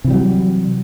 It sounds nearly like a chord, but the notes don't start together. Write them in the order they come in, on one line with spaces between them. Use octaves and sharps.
C3 E3 G3 F#3